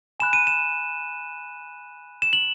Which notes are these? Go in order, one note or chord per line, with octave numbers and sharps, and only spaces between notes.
G#5 B5 F#6 E7
D#7
E7
E7
F#7